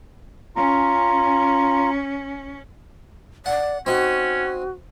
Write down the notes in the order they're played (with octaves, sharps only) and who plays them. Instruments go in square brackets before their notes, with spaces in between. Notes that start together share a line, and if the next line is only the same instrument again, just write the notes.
[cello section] C#4 [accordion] F4 A#5
[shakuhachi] D5 [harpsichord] F#5
[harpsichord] C4 D#4 [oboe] C#4 [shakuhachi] F#4